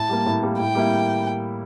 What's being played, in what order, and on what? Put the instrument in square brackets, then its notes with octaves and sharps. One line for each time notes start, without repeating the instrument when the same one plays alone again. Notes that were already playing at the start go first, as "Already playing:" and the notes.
Already playing: [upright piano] A2 [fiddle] A5
[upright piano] G3 A#3
A2
G3 A#3
[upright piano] A2 [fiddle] G5
[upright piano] G3 A#3 E4